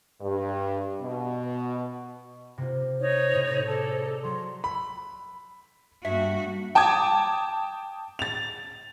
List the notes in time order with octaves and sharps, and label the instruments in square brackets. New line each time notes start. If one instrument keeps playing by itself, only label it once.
[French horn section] G2
B2
[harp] C3 A#3 F4 [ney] C5
[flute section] D#4 C#5
[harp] A2 C3
[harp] G#4 D5 [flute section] A4
[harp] A#5
[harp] F#3 [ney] C6
[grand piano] B5
[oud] G2 [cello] A#3 F#4 [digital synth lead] E5
[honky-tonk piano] G5 A5 D6 D#6 G#6
A6 F7